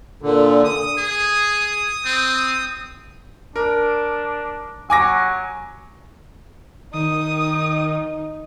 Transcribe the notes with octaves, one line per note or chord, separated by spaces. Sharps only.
A#2 D3
D#6
G#4
C4
D4 A#4
F#3 G#5 D6 A#6
D#3 D#4 D#6